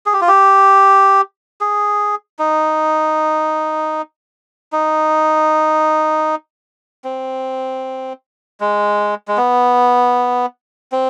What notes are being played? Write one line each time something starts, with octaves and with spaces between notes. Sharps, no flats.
G#4
G4
F4
G4
G#4
D#4
D#4
C4
G#3
G#3
B3
C4